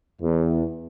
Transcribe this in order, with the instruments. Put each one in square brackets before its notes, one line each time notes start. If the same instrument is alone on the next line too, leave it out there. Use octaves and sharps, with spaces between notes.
[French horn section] E2